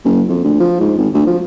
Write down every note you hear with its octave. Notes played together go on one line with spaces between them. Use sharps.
F#1
F2
D2
F3
G#2
G#1
D2
F3